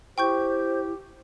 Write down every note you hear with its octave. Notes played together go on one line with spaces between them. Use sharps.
E4 G4 C5 G5 C#6 G6